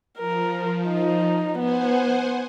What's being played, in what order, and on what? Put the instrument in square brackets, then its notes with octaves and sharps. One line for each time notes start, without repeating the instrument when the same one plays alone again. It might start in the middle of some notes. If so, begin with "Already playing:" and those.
[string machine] F3 [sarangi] A#4
[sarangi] D#4
[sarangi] B3 [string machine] C5 F#5 G#5